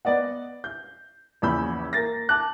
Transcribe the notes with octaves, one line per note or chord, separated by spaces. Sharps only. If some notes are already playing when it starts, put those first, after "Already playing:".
B3 D5 D#5 F#5
G6
A#1 E2 C#3 B5 E6 G6
A#3 A6 A#6
A5 D6 F#6